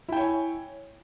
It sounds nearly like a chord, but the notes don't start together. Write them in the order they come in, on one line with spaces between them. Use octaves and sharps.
E4 G5 C#5 G#5